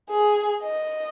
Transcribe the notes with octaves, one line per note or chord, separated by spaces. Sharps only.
G#4
D#5